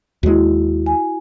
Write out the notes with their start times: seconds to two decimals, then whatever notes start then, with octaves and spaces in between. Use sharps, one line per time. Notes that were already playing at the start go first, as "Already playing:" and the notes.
0.23 D#2 G#3 E4 F#4
0.86 G#5